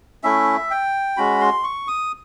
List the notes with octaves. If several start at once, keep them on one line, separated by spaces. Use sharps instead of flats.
A3 C#4 E4 E5
G5
G#3 C#4 F#4 B5
C6
C#6
D#6